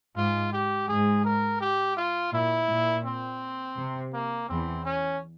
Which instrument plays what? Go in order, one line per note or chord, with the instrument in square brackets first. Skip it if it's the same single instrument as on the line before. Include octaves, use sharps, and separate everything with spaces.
[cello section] G#2 [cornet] F4
[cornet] G4
[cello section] G#2 [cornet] G#4
[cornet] A#4
G4
F4
[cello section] A#2 [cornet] E4
[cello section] A#2
[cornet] C4
[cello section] C3
[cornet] A#3
[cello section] E2 E3 [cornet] C4
[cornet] C#4